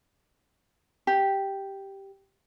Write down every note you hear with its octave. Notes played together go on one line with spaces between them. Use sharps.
G4